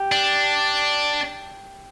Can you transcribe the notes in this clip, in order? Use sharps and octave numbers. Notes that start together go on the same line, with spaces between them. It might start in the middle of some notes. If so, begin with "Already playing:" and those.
Already playing: G4
D4